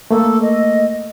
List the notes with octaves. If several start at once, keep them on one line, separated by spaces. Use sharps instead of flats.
A3 A#3 A4
D#5